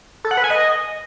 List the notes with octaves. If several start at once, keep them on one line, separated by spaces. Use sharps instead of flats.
A4
F#5
B4
G#5
D#5